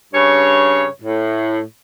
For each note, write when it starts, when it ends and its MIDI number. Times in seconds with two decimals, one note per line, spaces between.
0.14 0.86 43
0.14 0.86 49
0.14 0.86 73
1.02 1.60 45